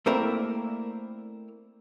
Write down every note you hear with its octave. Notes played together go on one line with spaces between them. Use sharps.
A3 A#3 C4 E4 A#4 D5